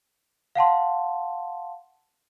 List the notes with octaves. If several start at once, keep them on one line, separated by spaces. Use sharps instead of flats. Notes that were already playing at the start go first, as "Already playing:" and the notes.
F5 F#5 A5 C6